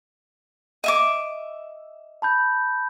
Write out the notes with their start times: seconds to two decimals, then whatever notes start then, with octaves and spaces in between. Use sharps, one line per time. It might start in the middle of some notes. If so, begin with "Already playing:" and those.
0.84 D#5 E5 D6
2.22 A5 B5 G6